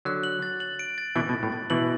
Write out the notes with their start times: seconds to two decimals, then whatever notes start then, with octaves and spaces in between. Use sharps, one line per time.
0.05 D3 F#3 F#6
0.23 F#7
0.42 A6
0.60 F#7
0.79 D7
0.98 A6
1.16 B2 E3 F#7
1.29 B2
1.33 A6
1.43 A2
1.52 A6
1.70 B2 E3 F#7